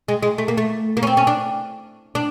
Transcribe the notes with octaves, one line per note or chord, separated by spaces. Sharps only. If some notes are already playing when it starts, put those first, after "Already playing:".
G#3
G#3
A3
A#3
A3
A#3
C#4
C4
C#4
D4
D4